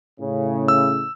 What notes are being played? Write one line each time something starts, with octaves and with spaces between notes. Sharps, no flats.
A2 C#3
E6